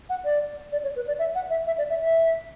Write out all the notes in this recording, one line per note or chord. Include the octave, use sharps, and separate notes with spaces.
F#5
D5
D5
C#5
B4
D5
E5
F#5
E5
E5
D5
E5
E5